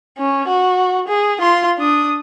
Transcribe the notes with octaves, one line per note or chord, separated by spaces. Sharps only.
C#4
F#4
G#4
F4 C6
D4 D#6